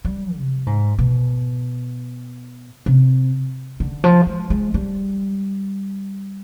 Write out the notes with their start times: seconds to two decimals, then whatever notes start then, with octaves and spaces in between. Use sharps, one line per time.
0.05 G3
0.35 C3
0.67 G#2
0.99 B2
2.86 C3
3.80 D3
4.04 F3
4.27 G#3
4.50 G#3
4.74 G3